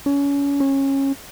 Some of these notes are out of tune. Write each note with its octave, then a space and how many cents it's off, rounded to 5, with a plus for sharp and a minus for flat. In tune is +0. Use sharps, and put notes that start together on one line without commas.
C#4 +30
C#4 -20